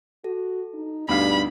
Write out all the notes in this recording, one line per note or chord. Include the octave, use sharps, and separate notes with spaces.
F#4 A4
D#4
D2 G2 B3 D4 D#4 F5 B5